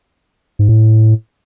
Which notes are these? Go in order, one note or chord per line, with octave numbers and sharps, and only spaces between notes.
G#2
A2